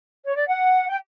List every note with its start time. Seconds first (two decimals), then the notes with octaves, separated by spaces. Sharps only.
0.25 C#5
0.36 D5
0.48 F#5
0.88 G5